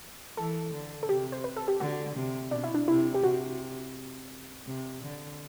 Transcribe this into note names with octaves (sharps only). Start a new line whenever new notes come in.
E3 A4
D3
A4
C3 G4
C5
B4
A4
G4
D3 F#4
C3
B2 D4
E4
D4
C3 E4
G4
C3 F#4
C3
D3